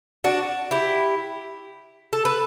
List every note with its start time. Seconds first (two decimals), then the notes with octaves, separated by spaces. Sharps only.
0.24 D4 F#4
0.71 E4 G4
2.13 A4
2.25 B4